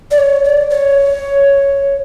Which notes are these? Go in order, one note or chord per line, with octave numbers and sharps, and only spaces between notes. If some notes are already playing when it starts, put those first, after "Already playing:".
D5
C#5
D5
C#5